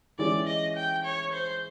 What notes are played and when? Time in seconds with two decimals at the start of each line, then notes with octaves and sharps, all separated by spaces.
0.19 E3 G#3 C#4 E4 G4 D5
0.47 D#5
0.76 G5
1.04 C#5
1.33 C5